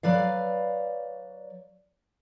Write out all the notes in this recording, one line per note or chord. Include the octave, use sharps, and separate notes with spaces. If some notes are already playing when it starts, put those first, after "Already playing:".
F#3 B4 D5 F5